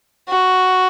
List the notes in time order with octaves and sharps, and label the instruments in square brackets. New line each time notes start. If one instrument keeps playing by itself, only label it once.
[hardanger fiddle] F#4